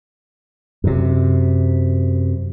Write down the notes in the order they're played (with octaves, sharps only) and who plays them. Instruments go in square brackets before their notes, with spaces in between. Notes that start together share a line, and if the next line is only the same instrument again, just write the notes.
[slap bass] F#2 C3